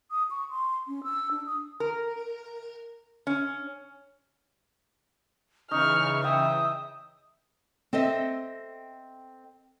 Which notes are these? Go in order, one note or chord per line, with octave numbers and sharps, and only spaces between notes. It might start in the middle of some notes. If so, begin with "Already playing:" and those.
D#6
C#6
C6
C#4
E6
D4
D#6
A#4
C#4
C#3 E3 D#4 C#6 F6
E5 G5 D#6
C4 A4 D#5 E5